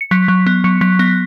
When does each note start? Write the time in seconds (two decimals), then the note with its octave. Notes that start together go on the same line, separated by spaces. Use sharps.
0.01 C#7
0.11 F#3 B6
0.28 F#3
0.46 B3
0.64 F#3 C#7
0.81 F#3 B6
0.99 B3 A#6